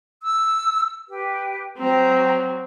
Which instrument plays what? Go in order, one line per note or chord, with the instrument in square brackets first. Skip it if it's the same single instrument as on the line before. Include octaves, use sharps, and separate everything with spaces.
[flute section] E6
G4 B4
[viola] F#3 C4 [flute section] G5 A#5